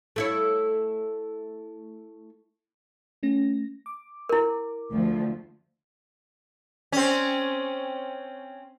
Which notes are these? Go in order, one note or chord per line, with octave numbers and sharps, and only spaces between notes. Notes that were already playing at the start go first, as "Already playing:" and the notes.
A3 E4 C#5
A3 C#4 A#6
D6
E4 A#4
D2 F3
C4 C#4